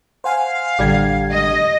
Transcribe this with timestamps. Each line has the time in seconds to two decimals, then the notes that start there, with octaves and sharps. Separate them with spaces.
0.24 C5 F5 F#5 G#5
0.79 A1 D3 G3 D4 G4 G#6
1.32 D#5